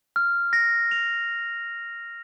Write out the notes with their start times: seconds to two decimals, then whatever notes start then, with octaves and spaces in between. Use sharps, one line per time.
0.16 F6
0.53 A#6
0.91 F7